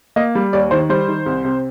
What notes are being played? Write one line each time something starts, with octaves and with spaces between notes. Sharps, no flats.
A#3 D#5
G3
D#2 D5
D#3 C5
G3 C5
D#3
C2
C3